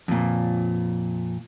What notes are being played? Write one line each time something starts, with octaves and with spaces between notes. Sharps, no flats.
F2 A#2